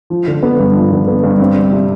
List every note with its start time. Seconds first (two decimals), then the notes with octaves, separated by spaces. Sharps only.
0.10 F3
0.28 D3
0.43 B3
0.60 G2
0.75 F3
0.92 D3
1.07 B3
1.24 G2
1.39 C4
1.56 G3
1.72 C3